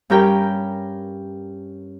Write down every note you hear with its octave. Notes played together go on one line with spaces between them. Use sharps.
G2 C#4 G4 A#4 G5